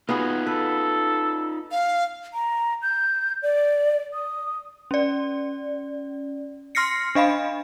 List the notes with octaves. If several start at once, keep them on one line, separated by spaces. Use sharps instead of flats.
B3 D#4 F4 F#4 G#4
A4 B4
F5
A#5
G6
D5
D#6
C#4 D5
C6 F6 A#6 C7 C#7
D4 D#5 F5 B5